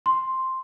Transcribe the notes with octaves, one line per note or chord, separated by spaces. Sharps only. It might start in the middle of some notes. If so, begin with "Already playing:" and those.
C6